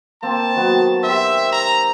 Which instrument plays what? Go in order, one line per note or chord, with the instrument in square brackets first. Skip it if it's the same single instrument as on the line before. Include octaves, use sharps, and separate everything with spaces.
[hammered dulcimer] A#3 C4 [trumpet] A5
[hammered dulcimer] D#3 F#3 B3
[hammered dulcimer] G4 C5 [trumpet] E5
[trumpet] A#5